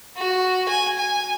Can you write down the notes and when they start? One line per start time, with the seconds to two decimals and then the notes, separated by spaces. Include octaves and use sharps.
0.17 F#4
0.69 G#5
0.98 G#5